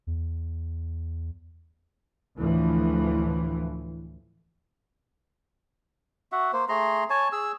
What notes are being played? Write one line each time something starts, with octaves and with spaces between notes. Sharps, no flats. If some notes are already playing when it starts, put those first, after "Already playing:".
E2
D2 A2 E3 F3
F#4 E5 F#5
A#3 C5
A3 G#4 A#5 C6
C#5 G#5 A5
G#4 E6